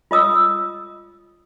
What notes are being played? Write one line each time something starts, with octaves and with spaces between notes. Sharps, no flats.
F4 D#5 D#6 E6